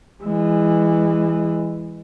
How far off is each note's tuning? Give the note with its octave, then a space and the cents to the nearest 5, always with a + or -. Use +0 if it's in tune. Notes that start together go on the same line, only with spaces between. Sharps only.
E3 +0 G#3 -25